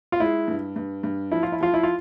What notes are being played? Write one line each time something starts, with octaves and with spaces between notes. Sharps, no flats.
F4
G#3 E4
G2
G2
G2
F3 E4
F4
E4
F3 F4
E4
F4